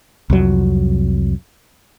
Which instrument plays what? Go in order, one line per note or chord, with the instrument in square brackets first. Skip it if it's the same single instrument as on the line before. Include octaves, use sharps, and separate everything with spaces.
[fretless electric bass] C2 F2 F#3